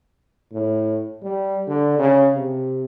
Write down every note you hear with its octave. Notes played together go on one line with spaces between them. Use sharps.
A2
G3
D3
C#3
C3